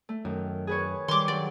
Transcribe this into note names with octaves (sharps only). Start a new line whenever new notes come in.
A3
F#2 D#3
G#4 B4 C#5
D#3 G3 C6 D6
G2 F#3 D5